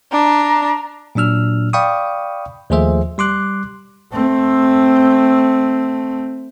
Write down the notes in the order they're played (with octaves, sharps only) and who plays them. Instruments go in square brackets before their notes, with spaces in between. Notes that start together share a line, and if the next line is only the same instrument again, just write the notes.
[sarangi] D4 [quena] A#5
[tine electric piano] A#2 F#3 D4 E6 F6
D5 F5 G5 B5 C#6 D#6
D#2 F3 A3 G#4 C5 E5
G3 C6 D6 F#6
[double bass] A3 C4